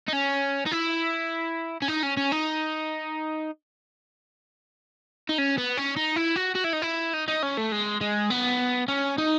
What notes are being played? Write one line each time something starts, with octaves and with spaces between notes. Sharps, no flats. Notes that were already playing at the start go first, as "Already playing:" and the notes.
D#4
C#4
D#4
E4
C#4
D#4
C#4
C#4
D#4
D#4
C#4
B3
C#4
D#4
E4
F#4
F#4
E4
D#4
E4
D#4
D#4
C#4
A3
G#3
G#3
B3
C#4
D#4